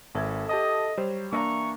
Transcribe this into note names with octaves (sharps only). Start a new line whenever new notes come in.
G#1 E4 A4 G#6
G4 D#5 A5 D#6
F#3 G3 C5
E3 A#3 D4 D#5 A#5 C#6